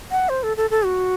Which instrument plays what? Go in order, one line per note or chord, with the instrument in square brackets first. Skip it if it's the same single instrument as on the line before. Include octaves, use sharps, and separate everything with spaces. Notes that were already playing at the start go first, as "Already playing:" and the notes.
[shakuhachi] F#5
C5
A4
A4
A4
F#4